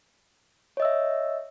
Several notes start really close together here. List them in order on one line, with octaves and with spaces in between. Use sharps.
C#5 D#5 E6 E5